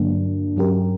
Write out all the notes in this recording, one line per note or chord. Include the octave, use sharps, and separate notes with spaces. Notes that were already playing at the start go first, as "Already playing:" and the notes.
Already playing: G2 D3 F#3 A#3 D4
G2 F#3 C#4 G4 A#4